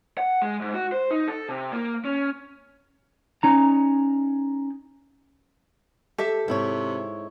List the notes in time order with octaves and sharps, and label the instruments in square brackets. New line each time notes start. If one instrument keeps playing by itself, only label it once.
[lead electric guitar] F#5
G#3
G#2
F#4
C5
D#4
A4
C3
A#3
C#4
[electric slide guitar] C#4 D#4 A#5
[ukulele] G4 E5 [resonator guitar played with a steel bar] A4
[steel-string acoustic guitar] G#2 E4 C#5 [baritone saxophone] C3